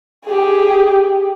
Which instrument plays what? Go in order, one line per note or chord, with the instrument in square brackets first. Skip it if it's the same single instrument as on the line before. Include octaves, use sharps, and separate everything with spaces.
[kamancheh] G4 G#4